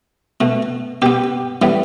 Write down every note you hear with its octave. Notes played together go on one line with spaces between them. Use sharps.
B2 A3
B2 B3 G4
A2 E3 G3 B3